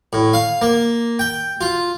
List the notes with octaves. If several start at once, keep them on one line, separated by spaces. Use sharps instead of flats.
A2
F5
A#3
G5
F4